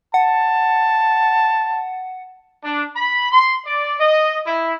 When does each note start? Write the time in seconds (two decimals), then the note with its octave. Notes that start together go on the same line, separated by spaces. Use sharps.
0.14 F#5 A5
2.64 D4
2.96 B5
3.32 C6
3.67 D5
4.00 D#5
4.47 E4